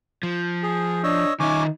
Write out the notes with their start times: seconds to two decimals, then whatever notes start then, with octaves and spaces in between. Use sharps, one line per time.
0.23 F3
0.63 G#4
1.04 D4 C#5 D#5 E6
1.40 D#3 C#4 D#4 E5 G#5 D6